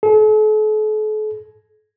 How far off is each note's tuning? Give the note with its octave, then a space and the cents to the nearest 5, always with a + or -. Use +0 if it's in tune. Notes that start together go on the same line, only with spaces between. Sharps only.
A4 -45